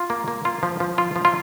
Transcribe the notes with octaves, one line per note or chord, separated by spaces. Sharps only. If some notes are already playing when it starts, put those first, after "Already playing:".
Already playing: F4
A#3
A#3
F4
F3
F3
F4
F3
F4